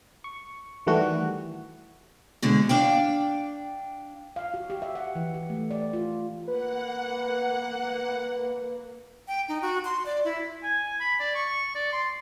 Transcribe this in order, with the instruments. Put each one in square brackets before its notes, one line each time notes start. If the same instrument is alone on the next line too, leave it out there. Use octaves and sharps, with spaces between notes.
[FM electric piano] C#6
D#3 E3 G3 A3 F#4
[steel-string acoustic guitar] B2 D3 G#3
D4 F5 G5
[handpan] F5
F#4
G4
E5
F#5
E3
G4
A3
D5
F4
[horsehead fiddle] A#3 [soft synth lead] B4 [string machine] F#5
[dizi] G5
D#4
F#4
C6
D5
E4
[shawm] G#5
B5
D5
C#6
D5
C6